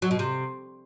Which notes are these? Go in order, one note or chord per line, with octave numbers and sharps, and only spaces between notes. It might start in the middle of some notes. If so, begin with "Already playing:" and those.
F#3
B2
C3